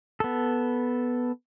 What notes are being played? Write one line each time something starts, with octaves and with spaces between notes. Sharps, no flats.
B3 A4